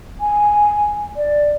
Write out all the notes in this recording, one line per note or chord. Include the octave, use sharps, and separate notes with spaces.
G#5
D5